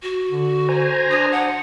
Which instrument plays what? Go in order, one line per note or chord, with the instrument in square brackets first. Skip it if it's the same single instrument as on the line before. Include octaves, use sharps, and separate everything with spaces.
[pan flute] F#4
[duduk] D3
[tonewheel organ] C5 G#5 A#5
[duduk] D4 [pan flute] D#6
[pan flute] F#5